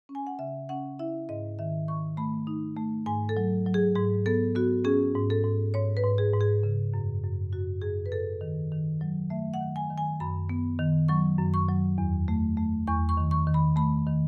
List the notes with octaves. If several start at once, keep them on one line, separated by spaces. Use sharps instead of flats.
C#4
G#5
F#5
C#3 E5
C#4 F#5
E4 E5
G#2 D#5
D#3 E5
D#3 C#6
A3 B5
D#4
A3
G#2 G#5
A4
F#3
F#3
G#4
G#2 G#4
B3 A4
B3 F#4
C#4 G#4
G#2
A4
G#2
G#2 C#5
B4
G#2
G#4
G#2
G#4
C#3
F#2
F#2
F#2 F#4
F#2 G#4
B4
F#2 A4
D#3
D#3
F#3
A3 E5
F#5
D#3
G#5
D#3
G#5
F#2 B5
B3
D#3
F#3 C#6
F#2
C#6
F#3
E2
A3
A3
E2 C#6
C#6
D#3
C#6
D#3
B5
A3 B5
D#3